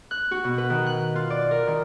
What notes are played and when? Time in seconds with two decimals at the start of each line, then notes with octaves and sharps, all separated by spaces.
0.11 F#6
0.31 F#4
0.44 B2
0.58 B4
0.70 D#3
0.86 F#6
1.16 F4
1.30 D5
1.51 A#4
1.67 D#3